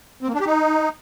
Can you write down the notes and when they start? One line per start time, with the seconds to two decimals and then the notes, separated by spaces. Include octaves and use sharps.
0.23 C4
0.28 A#3
0.34 D4
0.40 G4
0.46 D#4